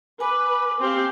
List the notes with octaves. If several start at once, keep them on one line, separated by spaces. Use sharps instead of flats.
B4 G#5 D6
C4 G4 F5